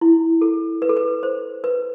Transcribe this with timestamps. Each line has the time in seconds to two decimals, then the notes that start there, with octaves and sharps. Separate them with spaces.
0.01 E4
0.41 A4
0.82 B4
0.89 A4
0.97 B4
1.23 C5
1.64 B4